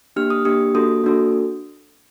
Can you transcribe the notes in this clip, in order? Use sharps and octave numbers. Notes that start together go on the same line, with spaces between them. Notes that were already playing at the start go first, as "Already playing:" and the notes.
A#3 D4 G4 F6
D#6
A#3 D4 G4 D#6
A#3 D4 F#4 A4 D#6
A#3 D4 F#4 A4